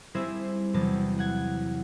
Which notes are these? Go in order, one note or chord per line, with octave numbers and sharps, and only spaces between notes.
G3 C4 E4 G#4 C5 E5
E2 C3 F#3 A5
F#5 G#6